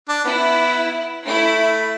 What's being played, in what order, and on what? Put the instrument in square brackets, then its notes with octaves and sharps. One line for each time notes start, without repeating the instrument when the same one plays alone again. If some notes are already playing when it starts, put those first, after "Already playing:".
[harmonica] D4
[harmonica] B3 [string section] E4
[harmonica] A3 [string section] E4